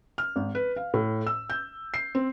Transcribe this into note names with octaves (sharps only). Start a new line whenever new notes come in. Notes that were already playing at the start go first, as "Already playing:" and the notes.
F6
G#1
B4
F5
A2
E6
G6
C7
C4